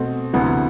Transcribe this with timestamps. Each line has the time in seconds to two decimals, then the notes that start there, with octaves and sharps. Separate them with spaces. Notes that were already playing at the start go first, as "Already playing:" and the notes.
Already playing: B2 A3 C4
0.33 D2 C3 E3 B3